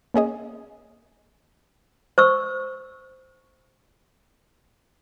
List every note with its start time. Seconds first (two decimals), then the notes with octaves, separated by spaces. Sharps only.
0.14 A#3 C#4 G#4 D#5
2.18 C5 C#6 E6